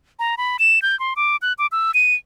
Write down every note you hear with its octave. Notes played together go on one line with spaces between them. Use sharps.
A#5
B5
E7
G6
C6
D6
F#6
D6
E6
D#7